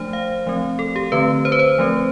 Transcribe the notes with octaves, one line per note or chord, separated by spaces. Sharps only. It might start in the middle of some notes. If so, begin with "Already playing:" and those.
Already playing: F3 A3 D4 C5
F5
F3 A3 C4
A4
G4
D3 A3 C4 B4
C5
B4
C5
F3 A3 C4